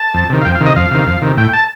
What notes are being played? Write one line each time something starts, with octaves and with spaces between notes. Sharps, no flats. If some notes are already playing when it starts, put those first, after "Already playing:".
Already playing: A5
F2
C3 D#3
F5
F2 G5
F5
C3 D#3
D#5
F2 F5
C3 D#3
F2
C3 D#3
A2 G5
A5